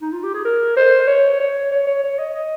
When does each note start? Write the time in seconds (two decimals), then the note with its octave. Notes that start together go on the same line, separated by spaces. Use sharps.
0.01 D#4
0.12 F4
0.23 G4
0.34 G#4
0.45 A#4
0.76 C5
1.07 C#5
1.40 C#5
1.71 C#5
1.87 C#5
2.04 C#5
2.19 D#5
2.34 D#5